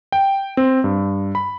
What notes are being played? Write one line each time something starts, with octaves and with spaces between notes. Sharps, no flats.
G5
C4
G2
B5